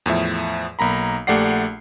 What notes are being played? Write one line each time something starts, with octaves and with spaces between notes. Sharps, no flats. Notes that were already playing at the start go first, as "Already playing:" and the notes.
E2 A2 F3 E5
B1 A#3 A#5 B5
A#1 A3 G4 D5 F#5 C7